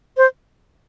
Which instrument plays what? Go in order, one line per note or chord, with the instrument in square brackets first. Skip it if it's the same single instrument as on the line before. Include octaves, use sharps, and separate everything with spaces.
[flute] C5